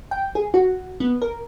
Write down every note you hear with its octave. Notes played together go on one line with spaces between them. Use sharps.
G5
G#4
F#4
B3
A#4